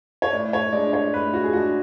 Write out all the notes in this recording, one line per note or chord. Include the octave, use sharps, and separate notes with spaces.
C#5
A2 D5
C#5
G#3 D4 D5
C#5
A2 B4
F#4
G#4
G#3 D4 F#4